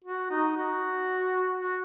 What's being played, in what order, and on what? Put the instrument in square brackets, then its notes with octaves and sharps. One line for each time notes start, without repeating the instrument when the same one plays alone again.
[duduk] F#4
D#4
F#4
F#4